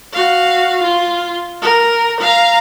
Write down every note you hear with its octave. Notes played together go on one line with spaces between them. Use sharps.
F#4 F5
F4
A#4
F5 A#5